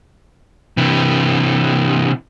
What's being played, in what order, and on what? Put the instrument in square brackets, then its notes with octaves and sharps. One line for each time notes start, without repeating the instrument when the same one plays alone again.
[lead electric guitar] C3 E3